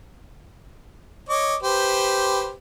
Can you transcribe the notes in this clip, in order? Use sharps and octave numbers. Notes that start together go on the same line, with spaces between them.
C#5 D#5 D6
G4 B4 C5